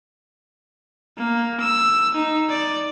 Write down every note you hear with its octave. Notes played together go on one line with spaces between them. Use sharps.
A#3
E6
D#4
D5